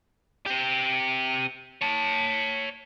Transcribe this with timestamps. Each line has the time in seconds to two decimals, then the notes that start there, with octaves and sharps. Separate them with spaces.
0.46 C4 G4
1.81 C#5 A5